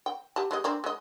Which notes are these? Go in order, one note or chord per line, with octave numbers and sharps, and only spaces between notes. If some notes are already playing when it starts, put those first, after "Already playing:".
G5
G4 A5
G#3 G4 D#5
A#3 C4 D4
G#3 D#5